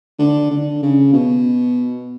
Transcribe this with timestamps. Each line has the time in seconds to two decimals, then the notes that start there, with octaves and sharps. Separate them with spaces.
0.19 D3
0.51 D3
0.83 C#3
1.13 B2